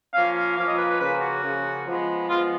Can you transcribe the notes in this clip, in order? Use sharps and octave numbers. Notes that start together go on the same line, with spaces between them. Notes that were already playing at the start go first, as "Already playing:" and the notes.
F3 A#3 C#4 F5
F5
F3 A#3 C#4 F5
D#5
B4
B4
C#3 F3 A#3 C#4 B4
F#4
C#3 F3 A#3 C#4
F3 G#3 B3
F3 G#3 B3 F4